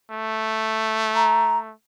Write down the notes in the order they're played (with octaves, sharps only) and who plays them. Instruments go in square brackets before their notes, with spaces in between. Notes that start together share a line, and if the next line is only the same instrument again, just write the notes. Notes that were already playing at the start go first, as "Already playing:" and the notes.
[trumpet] A3
[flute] A#5